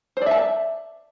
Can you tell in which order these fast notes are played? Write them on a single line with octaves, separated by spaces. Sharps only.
C5 D5 E5 A5